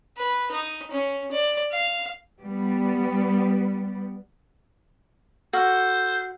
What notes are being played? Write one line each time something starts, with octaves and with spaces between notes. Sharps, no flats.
B4
D#4
C#4
D5
F5
G3 B3
F#4 A4 C5 E6 F6